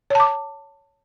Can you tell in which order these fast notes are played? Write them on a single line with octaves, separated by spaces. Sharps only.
C#5 A5 D6